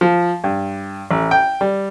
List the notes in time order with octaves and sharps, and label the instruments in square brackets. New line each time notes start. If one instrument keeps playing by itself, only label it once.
[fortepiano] F3
G2
A1
G5
G3